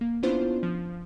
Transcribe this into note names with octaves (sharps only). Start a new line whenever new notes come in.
A#3
B3 C#4 D4 E4 F4 C5
F3